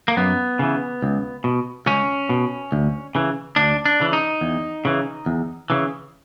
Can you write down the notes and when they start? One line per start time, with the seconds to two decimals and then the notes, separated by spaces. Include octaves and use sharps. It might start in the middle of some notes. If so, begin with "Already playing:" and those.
0.08 A#3
0.17 F#2 B3
0.59 C#3 E3
1.03 C#2
1.44 B2
1.86 C#2 C#4
2.29 B2
2.72 D2
3.15 C#3 E3
3.56 D2 D4
3.86 D4
4.00 C#3 E3
4.13 D#4
4.41 E2
4.85 C#3 E3
5.26 E2
5.70 C#3 E3